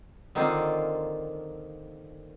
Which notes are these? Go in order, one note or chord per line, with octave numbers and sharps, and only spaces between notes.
D3 D#3 A#3 C4 F4